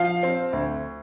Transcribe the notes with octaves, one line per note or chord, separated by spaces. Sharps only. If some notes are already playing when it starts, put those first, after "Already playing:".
Already playing: F3 F5
C4
D2